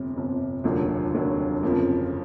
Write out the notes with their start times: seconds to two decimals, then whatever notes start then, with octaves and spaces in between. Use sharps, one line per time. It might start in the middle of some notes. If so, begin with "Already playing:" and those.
Already playing: G1 F2 C3
0.14 G1 F2 C3
0.64 F1 D#2 D3 F#3 A#3
1.13 F1 D#2 D3 F#3 A#3
1.63 G1 F2 C#3 F3 A#3